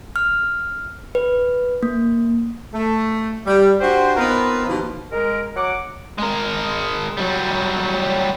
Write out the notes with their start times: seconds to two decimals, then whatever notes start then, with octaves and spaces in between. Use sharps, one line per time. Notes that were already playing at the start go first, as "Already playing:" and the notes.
0.16 F6
1.15 B4
1.83 A#3
2.73 A3
3.46 G3
3.80 D4 F#4 G4 C5
4.17 B3 C4 D#4 F4 A#4 B4
4.66 D#2 B2 E3 F3
5.12 G#3 A#4
5.56 F#3 F#5 D6
6.18 G#3 A#4
7.17 F#3 G3